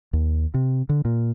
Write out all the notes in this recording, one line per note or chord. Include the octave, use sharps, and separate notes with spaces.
D#2
C3
D3
A#2